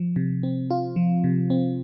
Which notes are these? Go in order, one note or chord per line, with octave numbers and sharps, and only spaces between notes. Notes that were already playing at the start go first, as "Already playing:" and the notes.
Already playing: F3
C3
C4
F4
F3
C3
C4